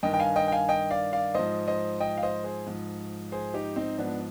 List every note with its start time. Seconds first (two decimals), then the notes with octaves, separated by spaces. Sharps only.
0.03 G2 D#3 D#5 G5
0.14 G5
0.20 F5 G#5
0.36 D#5 G5
0.48 G5
0.52 F5 G#5
0.69 D#5 G5
0.91 D5 F5
1.13 D5 F5
1.34 G#2 F3 C5 D#5
1.68 C5 D#5
2.00 D#5 G5
2.17 F5
2.23 C5 D#5
2.44 G#4 C5
2.66 G#2 F3
3.32 G#4 C5
3.54 D#4 G4
3.76 C4 D#4
3.98 G#2 F3 B3 D4